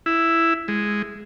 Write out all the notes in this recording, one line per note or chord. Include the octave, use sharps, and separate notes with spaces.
E4
G#3